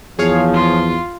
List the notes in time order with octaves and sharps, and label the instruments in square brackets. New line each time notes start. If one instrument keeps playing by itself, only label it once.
[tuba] E2 [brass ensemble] F3 [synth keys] G#4 C#5 F5
[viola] F4